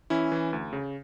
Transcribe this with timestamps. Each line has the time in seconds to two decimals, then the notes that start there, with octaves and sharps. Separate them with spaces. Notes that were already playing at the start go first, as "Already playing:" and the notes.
0.10 E3 C#4 E4
0.32 E3
0.53 D2
0.73 C#3